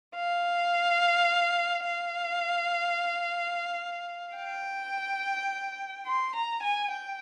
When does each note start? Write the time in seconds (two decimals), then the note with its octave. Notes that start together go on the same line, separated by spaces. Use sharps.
0.16 F5
1.84 F5
4.37 G5
6.06 C6
6.35 A#5
6.63 G#5
6.91 G5